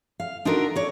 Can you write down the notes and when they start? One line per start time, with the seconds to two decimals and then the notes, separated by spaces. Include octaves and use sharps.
0.20 F5
0.45 D4 D#4 F4 F#4 A4 A#4
0.76 C#5 D5